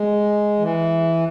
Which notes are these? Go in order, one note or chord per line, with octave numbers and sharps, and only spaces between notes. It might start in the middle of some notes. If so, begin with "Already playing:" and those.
Already playing: G#3
E3